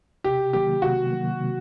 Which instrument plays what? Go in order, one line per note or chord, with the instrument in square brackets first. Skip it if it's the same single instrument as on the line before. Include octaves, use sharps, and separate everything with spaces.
[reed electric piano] C3 [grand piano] G4
[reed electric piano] D#3 F#3 A#3 [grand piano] G4
[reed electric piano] C3 [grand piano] F#4
[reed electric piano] D#3 F#3 A#3
C3